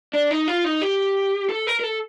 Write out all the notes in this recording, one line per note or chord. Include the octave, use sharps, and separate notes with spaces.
D4
D#4
F4
D#4
G4
A4
A#4
A#4
A4